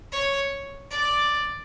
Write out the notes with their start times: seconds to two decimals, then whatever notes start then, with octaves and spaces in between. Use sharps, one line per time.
0.12 C#5
0.91 D5